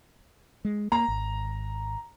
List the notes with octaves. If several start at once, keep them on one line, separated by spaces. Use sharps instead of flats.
G#3
A#3 A#5
G#1